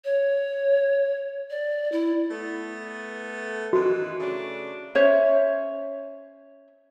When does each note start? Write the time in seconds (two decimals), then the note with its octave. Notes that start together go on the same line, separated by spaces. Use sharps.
0.05 C#5
1.50 D5
1.92 E4
2.31 A3 B3
3.73 F#2 D#3 E3 F#4
4.20 C#3 A3 D4
4.95 C#4 C5 C#5 E5